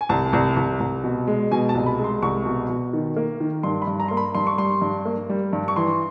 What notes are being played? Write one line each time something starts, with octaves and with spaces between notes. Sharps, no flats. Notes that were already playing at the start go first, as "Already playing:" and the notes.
G#5
C2 A5
C2
C2
C2
B2
G#3
B2 G#5
A5
C2
B5
G#3
C6
C2 C#6
B2
B2
D#3
A#3
D#3
G2 C6
B5
G2
A#5
A#3 C6
B5
G2 C6
C#6
G3 C6
G2
A#3
G3
G2
C#6
E3 C6